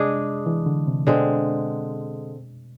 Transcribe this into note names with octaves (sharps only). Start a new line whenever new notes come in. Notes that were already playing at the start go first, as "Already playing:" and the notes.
Already playing: C3 G#3 D4 G#4
E3
D3
C3
B2 D3 G#3 C4